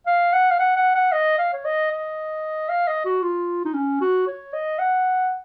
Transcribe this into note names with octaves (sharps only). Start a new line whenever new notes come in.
F5
F#5
F5
F#5
F#5
F#5
D#5
F5
C#5
D#5
D#5
F5
D#5
F#4
F4
D#4
C#4
F#4
C#5
D#5
F#5